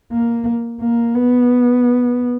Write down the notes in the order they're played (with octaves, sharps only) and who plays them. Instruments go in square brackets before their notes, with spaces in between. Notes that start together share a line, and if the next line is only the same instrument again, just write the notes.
[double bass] A#3
A#3
B3